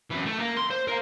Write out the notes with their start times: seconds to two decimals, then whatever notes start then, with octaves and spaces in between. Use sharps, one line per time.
0.10 F#2 E3
0.26 A3
0.39 A#3
0.57 C6
0.70 C5
0.87 A#4 F5